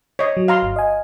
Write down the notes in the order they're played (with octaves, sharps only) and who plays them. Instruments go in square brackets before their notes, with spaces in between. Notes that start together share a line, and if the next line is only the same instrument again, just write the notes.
[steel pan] C#5 D#5
[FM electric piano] F#3
[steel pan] F5 A#5 C6
[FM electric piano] G1
D#5 G#5